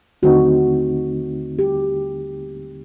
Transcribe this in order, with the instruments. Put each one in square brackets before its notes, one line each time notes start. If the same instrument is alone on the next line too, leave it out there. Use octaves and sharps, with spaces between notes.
[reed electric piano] D#2 D3 A3 C4 D#4 [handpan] F#4
[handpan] G4